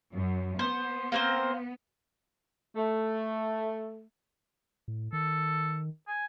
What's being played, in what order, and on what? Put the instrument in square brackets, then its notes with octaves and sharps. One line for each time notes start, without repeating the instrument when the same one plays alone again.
[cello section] F#2
[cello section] B3 [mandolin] C5
[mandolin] A#3 C4 C5
[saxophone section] A3
[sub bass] A2
[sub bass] D#3 [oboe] A4
[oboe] G#5